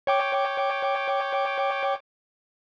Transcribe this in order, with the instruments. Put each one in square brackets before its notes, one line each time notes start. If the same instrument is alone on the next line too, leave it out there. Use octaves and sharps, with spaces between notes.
[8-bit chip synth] C#5 G5 D6